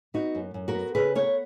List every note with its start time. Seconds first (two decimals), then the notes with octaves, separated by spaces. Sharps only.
0.14 B3 D#4 F#4
0.35 F#2
0.54 F#2
0.68 F#4 A#4
0.75 B3
0.95 C#3 G#4 B4
1.15 B3 A#4 C#5